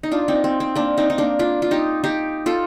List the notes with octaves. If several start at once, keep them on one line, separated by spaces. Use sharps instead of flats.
D#4
D4 F4
C4 D#4
C4
C4
A#3 D4
C4 D#4
D#4
A#3 D4
D4 F4
F4
D#4 G4
D#4 G4
F4 A4